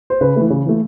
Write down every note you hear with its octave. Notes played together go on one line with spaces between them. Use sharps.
C5
C#3 B4
E3 A3
C#3
E3 A3